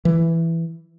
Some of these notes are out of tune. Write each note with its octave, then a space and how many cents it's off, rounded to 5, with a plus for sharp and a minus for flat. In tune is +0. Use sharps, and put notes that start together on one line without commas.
E3 +5